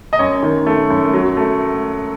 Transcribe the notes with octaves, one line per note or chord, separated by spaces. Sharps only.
D#5
F#2 C#5
D#3
A3
F#2
F#3
A3